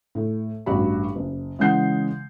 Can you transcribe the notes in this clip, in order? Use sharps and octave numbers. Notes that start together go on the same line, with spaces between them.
A2
A1 G2 F#4 B5
F#1
C#3 E3 G#3 F#5 G6 C7